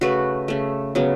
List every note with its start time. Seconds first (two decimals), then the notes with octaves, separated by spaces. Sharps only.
0.01 C#3 A3 F#4 B4
0.48 C#3 A3
0.95 C#3 F#3 B3